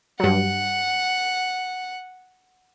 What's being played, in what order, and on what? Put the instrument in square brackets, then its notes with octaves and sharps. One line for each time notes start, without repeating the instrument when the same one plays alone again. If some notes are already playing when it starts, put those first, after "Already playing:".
[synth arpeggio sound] G2 F#3 [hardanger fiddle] F#5